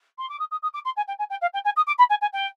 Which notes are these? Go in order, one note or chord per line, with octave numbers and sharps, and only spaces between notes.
C6
D6
D#6
D#6
D#6
D6
C6
G#5
G5
G#5
G5
F5
G5
G#5
D#6
D6
B5
G#5
G#5
G5